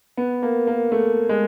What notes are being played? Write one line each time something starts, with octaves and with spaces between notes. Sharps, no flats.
B3
A#3
A#3
A3
G#3